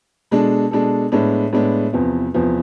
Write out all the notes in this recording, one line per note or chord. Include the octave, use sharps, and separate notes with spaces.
B2 G#3 D4 A4
B2 G#3 D4 A4
A2 G#3 B3 D4
A2 G#3 B3 D4
E2 C3 F3 B3
E2 C3 F3 B3